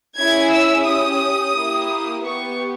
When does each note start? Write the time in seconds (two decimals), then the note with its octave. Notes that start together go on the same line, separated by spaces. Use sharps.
0.17 C#4 E4 G#4 G#6
0.51 E6
0.87 C#4 G4 D#6
1.55 A#3 E4 G4
2.24 B3 G4 C#6